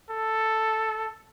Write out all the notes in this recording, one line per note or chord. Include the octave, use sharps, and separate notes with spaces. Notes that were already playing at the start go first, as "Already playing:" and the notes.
A4